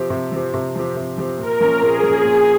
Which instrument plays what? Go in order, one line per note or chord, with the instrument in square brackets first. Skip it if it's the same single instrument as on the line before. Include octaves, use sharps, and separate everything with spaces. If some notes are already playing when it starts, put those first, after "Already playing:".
Already playing: [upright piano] C3 F3 C4 G4
C3
F3 C4 G4
C3
F3 C4 G4
C3
F3 C4 G4
[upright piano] A#2 [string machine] A#4
[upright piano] F3 A#3 C#4
[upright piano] A#2 [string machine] G#4
[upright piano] F3 A#3 C#4
A#2